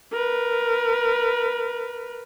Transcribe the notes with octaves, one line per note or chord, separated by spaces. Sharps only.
A#4 B4